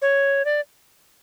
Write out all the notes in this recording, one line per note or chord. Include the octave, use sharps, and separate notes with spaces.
C#5
D5